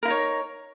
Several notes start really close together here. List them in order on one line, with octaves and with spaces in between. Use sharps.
A#4 E4 D#4 C#5